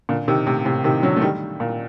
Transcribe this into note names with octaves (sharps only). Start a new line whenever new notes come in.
A#2 D3
C3 D#3
A2 C3
A2 C3
C3 D#3
D3 F#3
A3
D#3 G3
A#2